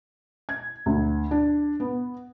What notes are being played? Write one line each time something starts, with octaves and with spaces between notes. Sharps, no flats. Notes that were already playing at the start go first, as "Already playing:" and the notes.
G#6
D2
D4
B3